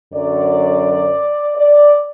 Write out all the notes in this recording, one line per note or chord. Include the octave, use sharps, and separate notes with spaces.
F#2 D3 F#3 D5
D5